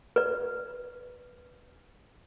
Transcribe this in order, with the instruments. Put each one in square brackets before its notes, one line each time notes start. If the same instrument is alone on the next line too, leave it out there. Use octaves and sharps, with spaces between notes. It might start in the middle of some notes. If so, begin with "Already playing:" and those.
[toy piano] B4 D5